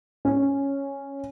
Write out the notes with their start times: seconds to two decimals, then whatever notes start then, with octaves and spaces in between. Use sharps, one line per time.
0.25 C#4